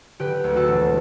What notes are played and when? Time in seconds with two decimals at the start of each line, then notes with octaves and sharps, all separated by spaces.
0.19 D3 G4 B4
0.44 D2
0.56 F#4 A4
0.68 E1